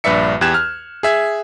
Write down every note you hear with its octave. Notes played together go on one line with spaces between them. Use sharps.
A#1 G2 B4 D5 E5 C#7
E2 G4 F#6 G#6 E7
F6
G#4 E5 G#6